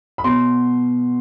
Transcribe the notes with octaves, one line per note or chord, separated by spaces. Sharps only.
B5
B2 C6